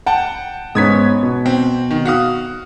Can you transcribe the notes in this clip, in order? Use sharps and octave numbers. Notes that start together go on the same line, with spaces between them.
F#5 G5 A5
G#2 B3 C#4 D#6 G#6 B6
B2
C4
D#3
F#4 F5 D#6